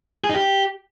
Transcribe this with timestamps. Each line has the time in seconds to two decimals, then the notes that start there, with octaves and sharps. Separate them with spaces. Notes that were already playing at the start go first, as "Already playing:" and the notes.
0.24 G#4
0.29 D#4
0.34 G4